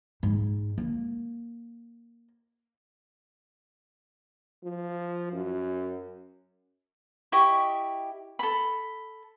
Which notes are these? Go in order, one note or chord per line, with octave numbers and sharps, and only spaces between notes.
G#2
A#3
F3
F#2
E4 G4 D#5 C#6
A4 B5